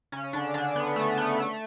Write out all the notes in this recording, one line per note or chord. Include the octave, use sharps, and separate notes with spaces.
C#3 C#4
D3 D4
D3 D4
B3
A3
B3
A3